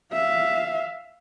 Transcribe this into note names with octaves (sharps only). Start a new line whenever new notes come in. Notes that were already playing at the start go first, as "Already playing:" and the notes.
E5 F5